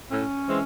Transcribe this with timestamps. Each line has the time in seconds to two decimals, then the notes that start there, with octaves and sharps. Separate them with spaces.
0.10 A2 C#4
0.46 E3 G#3 C4